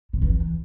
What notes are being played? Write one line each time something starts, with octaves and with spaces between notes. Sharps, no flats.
D3
E3